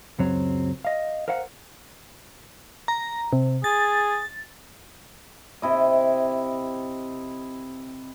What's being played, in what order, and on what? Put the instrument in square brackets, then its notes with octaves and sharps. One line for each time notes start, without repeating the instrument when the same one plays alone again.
[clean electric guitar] C#2 F#2 F#3 C4 C#5
D#5 F5
A#4 C5 F5 F#5
[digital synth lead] A#5
C3
[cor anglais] G#4 [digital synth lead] A6
[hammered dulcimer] C3 E4 D#5